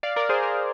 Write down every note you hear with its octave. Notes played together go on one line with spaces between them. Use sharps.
D5 F5
A#4 D5
G#4 C5
A#4